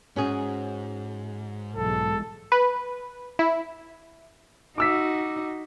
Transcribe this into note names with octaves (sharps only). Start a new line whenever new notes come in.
G#2 C#4 F#4 G#4
B1 E3 G#3 A4
B4
E4
D#4 F#4 D6 E6 B6